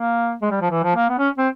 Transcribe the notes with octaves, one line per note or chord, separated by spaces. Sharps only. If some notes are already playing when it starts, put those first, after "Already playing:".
Already playing: A#3
G#3
G3
F3
E3
F3
A#3
B3
C#4
C4